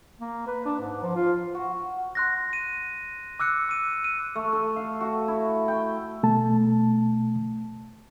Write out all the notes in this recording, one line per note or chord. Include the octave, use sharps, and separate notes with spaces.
A#3
B4
D4
G#2
F3
F4
F#4
C6 F#6 A#6
D#7
D6 E6 F#6 C#7
D6 D#7
D#7
A3
A4
F5
F#4
E4
G5
B2 A3 A5